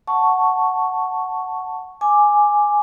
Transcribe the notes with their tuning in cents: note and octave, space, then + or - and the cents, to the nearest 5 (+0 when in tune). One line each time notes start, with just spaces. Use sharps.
F#5 +0 A5 +0 C#6 +0
G#5 +0 D6 +0